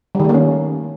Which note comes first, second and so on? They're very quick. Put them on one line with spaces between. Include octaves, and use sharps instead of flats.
G3 D#3 A3 A#3 C#4